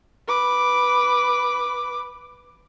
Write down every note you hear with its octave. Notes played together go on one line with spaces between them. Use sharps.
B4 D6